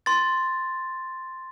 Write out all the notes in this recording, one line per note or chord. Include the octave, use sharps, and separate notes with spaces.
C6 A6